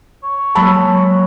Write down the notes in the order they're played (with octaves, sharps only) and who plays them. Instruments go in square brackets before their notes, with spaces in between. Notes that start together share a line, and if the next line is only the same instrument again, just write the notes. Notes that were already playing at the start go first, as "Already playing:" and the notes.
[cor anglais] C#5
[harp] F#3 G#3 A#3 [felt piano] A5 B5 E6